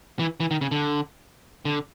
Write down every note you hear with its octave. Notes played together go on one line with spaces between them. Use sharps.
E3
E3
D#3
C#3
D3
D3